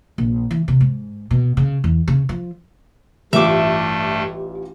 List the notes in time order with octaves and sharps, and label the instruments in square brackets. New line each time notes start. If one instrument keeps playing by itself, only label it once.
[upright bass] A#1
E3
C3
G#2
B2
C#3
E2
C#3
F3
[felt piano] A1 G3 F4 [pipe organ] G2 A3 [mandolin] E5 D6